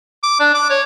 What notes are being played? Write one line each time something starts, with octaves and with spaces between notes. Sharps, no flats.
D6
D4
D6
C#5